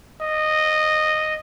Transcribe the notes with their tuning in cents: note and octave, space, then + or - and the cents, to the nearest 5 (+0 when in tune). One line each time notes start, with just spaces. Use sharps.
D#5 -10